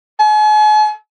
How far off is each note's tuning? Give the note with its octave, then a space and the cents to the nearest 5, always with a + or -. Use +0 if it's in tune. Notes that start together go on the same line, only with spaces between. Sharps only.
G#5 +45